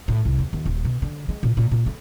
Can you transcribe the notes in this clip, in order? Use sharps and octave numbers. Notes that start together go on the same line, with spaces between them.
A2
C2
E2
D#2
D#1
B2
D3
G#3
A#2
A#2
A#2
A3